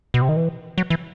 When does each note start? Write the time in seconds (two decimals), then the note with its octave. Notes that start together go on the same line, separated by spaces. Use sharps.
0.14 B2
0.22 C3
0.29 D#3
0.36 E3
0.78 F#3
0.90 E3